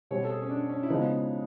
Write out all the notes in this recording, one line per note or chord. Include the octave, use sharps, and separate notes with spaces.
B2 G3 C4 C#5
A4
G#4
C#4
D4
C#4
E4
C#3 F3 G#3 B3 D#4